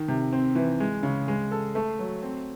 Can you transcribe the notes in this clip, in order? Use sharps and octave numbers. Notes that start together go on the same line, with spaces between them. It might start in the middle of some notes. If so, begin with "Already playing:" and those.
Already playing: D#3
C3
C4
E3
G#3
C#3
G#3
A4
A3
F#3
C4